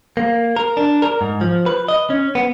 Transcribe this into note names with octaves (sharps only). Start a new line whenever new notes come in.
A#3
A#4
D4
A#4
G#2
F3
B4
D#5
C#4
B3